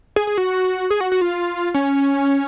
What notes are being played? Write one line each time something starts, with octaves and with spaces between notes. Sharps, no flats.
G#4
G#4
F#4
G#4
F#4
F#4
F4
C#4